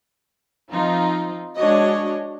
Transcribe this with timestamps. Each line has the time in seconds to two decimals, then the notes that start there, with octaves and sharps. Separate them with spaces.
0.71 F3 C4 D#4 F4
1.58 G#3 D4 F#4 C#5 D#5